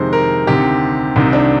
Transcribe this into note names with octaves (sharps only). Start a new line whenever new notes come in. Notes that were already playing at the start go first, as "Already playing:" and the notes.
Already playing: F2 C3 D#3 G#3 C5
A#4
D2 C3 D#3 G4
C2 C3 D#3
D4